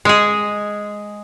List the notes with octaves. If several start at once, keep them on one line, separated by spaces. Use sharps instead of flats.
G#3 G#4